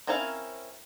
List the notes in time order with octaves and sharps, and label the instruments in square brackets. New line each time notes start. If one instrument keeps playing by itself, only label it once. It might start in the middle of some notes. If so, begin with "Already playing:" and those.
[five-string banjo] C4 C#4 E4 A#4 F5